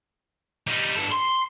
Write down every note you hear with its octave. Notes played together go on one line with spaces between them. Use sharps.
G3 D#4
G2 A4
C6